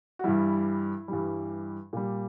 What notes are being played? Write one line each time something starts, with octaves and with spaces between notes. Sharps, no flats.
F#4
G2 E3 G3 E4
G2 E3 G3
A#2 G3